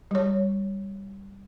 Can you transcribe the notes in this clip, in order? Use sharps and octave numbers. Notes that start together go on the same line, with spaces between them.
G3 C#5